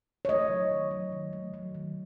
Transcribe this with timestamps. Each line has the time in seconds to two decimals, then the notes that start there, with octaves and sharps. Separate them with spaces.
0.25 C#5
0.29 A3 D#5
0.50 F#3
0.71 D#3
0.91 F#3
1.12 D#3
1.33 A3
1.54 F#3
1.75 D#3